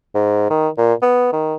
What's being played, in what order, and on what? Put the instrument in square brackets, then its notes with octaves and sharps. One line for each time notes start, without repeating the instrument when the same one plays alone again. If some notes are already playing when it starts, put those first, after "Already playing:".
[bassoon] G#2
D#3
A#2
B3
D#3